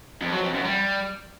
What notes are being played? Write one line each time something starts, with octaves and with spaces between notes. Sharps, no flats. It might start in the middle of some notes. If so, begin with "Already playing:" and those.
F2
F#3
F2
F#2
G3